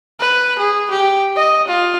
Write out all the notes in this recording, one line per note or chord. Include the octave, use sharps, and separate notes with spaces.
B4
G#4
G4
D#5
F4